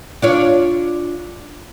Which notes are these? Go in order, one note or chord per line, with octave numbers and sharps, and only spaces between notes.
D4 F4 C#5